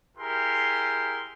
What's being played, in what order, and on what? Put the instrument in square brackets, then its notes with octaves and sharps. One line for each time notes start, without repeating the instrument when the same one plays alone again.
[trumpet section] E4 G4 G#4 A#4 C6